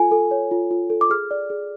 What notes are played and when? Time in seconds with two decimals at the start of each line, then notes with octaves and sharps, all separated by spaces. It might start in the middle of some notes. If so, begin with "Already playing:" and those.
Already playing: F4 A4 G#5
0.11 A4
0.31 C#5
0.51 F4
0.71 F4
0.90 A4
1.01 D6
1.10 G#4 F6
1.31 D5
1.50 G#4